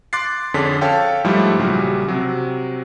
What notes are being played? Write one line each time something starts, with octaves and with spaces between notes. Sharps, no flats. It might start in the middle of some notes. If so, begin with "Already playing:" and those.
C6 D6 F#6 A6 C7
F2 D3 C#4 G#4 B6
A4 C#5 F5 G5 A5
G#2 F3 G3 A3 E4
A#1 C#3 F#3 G3
C3 F#3